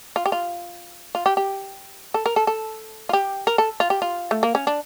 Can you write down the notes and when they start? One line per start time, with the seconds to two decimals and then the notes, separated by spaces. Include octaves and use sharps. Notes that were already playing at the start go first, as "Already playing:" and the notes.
0.16 F4
0.26 G4
0.32 F4
1.15 F4
1.26 G4
1.37 G4
2.14 A4
2.26 A#4
2.36 A4
2.47 A4
3.09 F4
3.13 G4
3.47 A#4
3.58 A4
3.80 F4
3.90 G4
4.02 F4
4.31 A3
4.43 A#3
4.55 C#4
4.67 D4